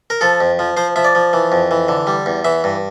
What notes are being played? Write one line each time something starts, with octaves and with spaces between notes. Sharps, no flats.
A#4
F3 A4
F2
F3
F3 C5
F3 E5
D5
F3
E3
F2
E3
D3
G3
E2
E3 E5
G2